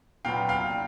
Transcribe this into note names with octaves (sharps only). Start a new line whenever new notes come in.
A#2 F#3 B3 F5 G5
F5 G5